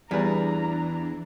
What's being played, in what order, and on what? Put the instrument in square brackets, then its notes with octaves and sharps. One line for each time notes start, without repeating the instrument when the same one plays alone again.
[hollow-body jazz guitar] E2 [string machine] E3 D4 [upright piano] G3 G#4 B4 [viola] A#5